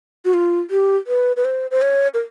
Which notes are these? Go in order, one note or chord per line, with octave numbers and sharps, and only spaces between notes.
F#4
F4
G4
B4
B4
C5
C5
C#5
A#4